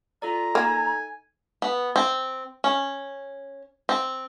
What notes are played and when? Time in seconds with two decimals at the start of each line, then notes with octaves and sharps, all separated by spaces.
0.22 F4 A4 D5 A#5
0.55 A#3 D#4 A4 G#5
1.62 B3
1.96 C4
2.64 C#4
3.89 C4